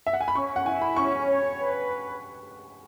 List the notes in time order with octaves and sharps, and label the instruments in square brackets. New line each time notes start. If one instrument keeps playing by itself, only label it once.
[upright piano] E5
F#5
G#5
B5
[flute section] C#4 [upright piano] C#6
[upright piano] F#5
[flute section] E4 [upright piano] G#5
[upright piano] B5
[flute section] C#4 [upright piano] C#6
[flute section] C#5
B4